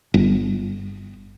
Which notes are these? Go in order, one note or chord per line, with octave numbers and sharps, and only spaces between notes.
G1